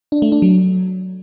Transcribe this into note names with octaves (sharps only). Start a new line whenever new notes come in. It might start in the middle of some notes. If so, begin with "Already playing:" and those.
D4
A3
D4
F#3